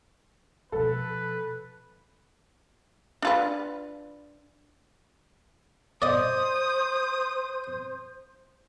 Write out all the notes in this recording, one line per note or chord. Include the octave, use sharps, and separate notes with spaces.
B2 F3 A4 B4
D4 F4 B4
C5 D5 D#5 D#6